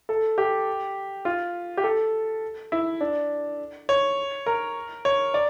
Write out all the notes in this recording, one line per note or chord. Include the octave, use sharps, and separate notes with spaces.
A4
G4
F4
G4
A4
E4
D4
C#5
A#4
C#5
D5